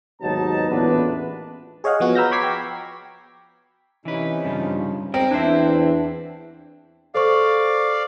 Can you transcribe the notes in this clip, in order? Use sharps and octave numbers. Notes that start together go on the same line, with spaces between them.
D#2 G#2 B2 F#3 D#4 A5
A1 E2 A#2 B3 D4 B4
G#4 C#5 D#5 F5 F#5
F3 B3 F#4
A#5 B5 E6 F6 G6 A#6
B5 C#6 D6 G#6 B6 C7
G5
C3 E3 C#4 D#4 B4
G2 C#3 F3
G#3 C4 A#4
E2 E3 D4 E4 C5 E5
A4 C5 D5 F5 C#6